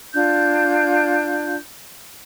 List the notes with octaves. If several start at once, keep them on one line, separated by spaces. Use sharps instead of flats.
D4 F4 F#6 G6